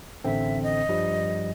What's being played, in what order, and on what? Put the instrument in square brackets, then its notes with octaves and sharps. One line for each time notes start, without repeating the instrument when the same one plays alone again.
[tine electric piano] A1 D3 C4 [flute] E5
[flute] D#5
[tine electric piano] G2 F3 G3